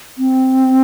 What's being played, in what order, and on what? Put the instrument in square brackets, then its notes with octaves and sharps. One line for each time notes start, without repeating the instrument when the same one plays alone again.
[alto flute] C4